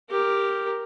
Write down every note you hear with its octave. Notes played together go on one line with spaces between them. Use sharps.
G4 A#4